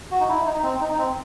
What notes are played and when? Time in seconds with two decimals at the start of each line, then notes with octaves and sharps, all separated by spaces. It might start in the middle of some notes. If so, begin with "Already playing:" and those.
0.11 F#4
0.20 D#4
0.29 E4
0.46 D#4
0.63 C4
0.81 D#4
0.98 C4